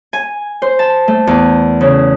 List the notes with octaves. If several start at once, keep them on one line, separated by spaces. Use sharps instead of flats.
G#5
C5
A5
A3
E2
C#3